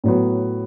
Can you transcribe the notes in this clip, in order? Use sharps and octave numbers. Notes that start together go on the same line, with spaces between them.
A2 F#3 B3